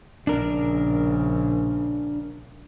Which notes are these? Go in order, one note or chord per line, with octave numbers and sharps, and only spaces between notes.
A#1 C#3 D4 A#4